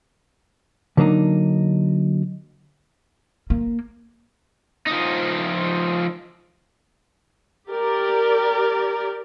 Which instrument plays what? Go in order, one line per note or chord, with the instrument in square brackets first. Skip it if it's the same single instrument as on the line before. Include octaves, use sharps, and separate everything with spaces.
[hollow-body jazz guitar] D3 F#3 A#3 D4 D#4
[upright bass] A#3
[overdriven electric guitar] F3 D#4
[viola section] G4 A#4 D5